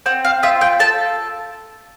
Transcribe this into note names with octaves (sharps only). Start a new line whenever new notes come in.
C4 F#5
F5
F4 E5
G5
A4 A5